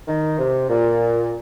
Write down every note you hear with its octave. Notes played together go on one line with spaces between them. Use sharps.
D#3
C3
A#2